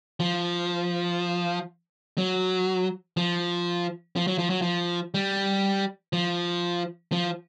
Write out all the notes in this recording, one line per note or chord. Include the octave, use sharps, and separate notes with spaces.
F3
F#3
F3
F3
F#3
F3
F#3
F3
G3
F3
F3